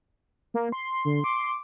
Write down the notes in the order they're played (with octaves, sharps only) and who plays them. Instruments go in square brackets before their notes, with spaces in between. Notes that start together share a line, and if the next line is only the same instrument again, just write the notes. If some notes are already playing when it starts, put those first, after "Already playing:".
[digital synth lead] A#3
C6
[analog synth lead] D3
D6